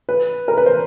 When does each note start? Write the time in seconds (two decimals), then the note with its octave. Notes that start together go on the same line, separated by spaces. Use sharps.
0.09 B4
0.48 A#4
0.58 B4
0.66 C5